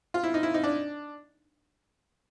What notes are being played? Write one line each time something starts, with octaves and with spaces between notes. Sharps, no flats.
F4
E4
D#4
E4
D#4
D4